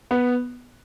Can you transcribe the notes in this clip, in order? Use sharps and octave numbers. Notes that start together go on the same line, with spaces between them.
B3